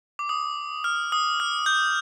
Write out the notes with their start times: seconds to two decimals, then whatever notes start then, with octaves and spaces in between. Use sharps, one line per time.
0.19 D6
0.29 D#6
0.84 F6
1.12 D#6
1.40 F6
1.66 G6